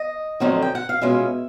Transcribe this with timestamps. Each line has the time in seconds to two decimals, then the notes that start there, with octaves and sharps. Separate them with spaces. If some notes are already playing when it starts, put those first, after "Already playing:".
Already playing: D#5
0.40 F2 D3 F#3 A3 C4
0.62 G5
0.75 F#5
0.89 F5
1.01 B2 G#3 C#4 F4 E5